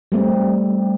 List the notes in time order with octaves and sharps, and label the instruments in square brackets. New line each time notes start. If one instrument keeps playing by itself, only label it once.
[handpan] G3 A3 C4